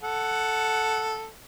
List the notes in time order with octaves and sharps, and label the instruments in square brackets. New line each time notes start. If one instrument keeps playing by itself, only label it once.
[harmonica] A4 F#5